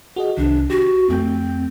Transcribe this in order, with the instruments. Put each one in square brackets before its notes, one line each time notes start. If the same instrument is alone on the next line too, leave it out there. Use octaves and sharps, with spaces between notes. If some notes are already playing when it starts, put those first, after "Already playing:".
[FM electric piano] F#4 G#4 D#5
[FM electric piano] C2 D#3 [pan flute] D4
[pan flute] F#4 [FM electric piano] G4
[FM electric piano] F2 A3 G6 [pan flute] C4